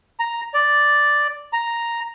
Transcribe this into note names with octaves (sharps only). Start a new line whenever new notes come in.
A#5
D5
A#5